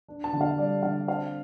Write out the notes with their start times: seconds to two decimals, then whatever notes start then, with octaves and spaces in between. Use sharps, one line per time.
0.08 D4
0.24 A5
0.33 D3
0.41 F5
0.58 G3 D5
0.83 D3 F5
1.07 C4 F5